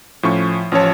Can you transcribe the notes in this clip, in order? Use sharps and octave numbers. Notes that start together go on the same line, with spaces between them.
A2 F3 C#4 C#6
A1 F3 C#4 F4 C#5 A5